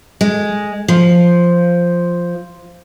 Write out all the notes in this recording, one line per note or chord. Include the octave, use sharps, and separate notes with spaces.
G#3
F3